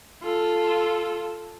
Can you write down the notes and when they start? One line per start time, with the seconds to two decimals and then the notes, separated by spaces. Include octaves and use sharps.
0.23 F4 A4